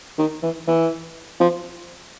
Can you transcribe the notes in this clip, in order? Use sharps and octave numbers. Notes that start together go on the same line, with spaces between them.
D#3
E3
E3
F3